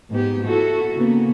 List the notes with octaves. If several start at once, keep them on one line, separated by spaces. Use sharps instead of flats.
G#2 B3 G4
E4 F#4 A4
C#3 A#3 B3